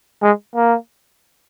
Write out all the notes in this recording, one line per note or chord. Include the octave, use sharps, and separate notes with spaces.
G#3
A#3